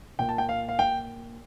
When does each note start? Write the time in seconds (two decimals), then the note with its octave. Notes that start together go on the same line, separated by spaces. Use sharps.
0.19 A#2 G5
0.29 A5
0.38 G5
0.49 F5
0.69 F5
0.79 G5